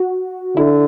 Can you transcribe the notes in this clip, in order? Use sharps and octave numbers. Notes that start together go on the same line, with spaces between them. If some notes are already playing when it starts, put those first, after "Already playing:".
Already playing: F#4
D3 E4